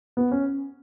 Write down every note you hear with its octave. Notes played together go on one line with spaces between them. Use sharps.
B3
C#4